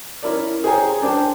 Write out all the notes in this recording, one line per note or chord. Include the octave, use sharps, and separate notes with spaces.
C#4 E4 A#4 D5
G#4 C5 C#5 G5 G#5 A#5
D4 C5 G5 A5